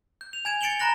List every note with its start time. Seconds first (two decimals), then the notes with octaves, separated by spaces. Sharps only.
0.21 G6
0.33 F7
0.45 G#5 G#6 E7
0.61 A6 C#7 D7 E7 F#7 G7
0.79 A#5 B5 F#6 A#6 F#7